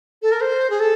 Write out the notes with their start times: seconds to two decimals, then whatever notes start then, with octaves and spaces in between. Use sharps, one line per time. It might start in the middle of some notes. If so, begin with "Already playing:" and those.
0.22 A4
0.32 A#4
0.41 C5
0.70 G#4
0.80 A4